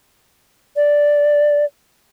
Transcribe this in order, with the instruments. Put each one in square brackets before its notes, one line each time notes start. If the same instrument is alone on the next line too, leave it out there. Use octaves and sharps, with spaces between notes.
[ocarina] D5